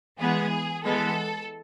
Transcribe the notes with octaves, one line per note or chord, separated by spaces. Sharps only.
E3 G#3 B3 G#4
E3 G#3 B3 A4